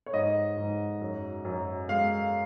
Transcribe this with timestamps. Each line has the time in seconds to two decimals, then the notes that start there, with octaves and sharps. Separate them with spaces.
0.06 C#5
0.13 G#2 D#5
0.57 G#2
1.01 F#2
1.45 F#2
1.89 G#3 F5